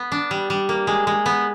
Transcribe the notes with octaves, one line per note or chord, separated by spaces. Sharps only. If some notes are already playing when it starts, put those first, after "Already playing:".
Already playing: B3
D4
G3
G3
A#3
G#3
G#3
B3